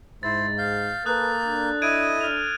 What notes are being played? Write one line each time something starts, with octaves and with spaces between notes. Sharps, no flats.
G#2 E4 C5 A6
F5 G6
A#3 A4 B4 D#6 F#6 G6
D4 A4
E4 D#5 G#6 D7 D#7
F6 F7